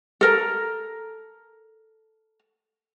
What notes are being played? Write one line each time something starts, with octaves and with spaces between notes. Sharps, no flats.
A4 A#4 A#5